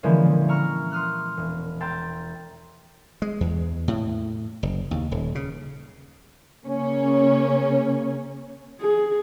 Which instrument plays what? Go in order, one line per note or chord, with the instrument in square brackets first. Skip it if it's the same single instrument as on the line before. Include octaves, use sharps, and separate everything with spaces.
[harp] D3 E3 F3 G#3 A#3 C#4
A#2
A#5 C#6 E6 F6
C6 D#6 F6 F#6
E1
G5 A#5 C6 E6 A6
[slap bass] G#3
E2
A2
F#1
D#2
D#1
C#3
[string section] C#3 A#3 C#4
[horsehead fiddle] G#4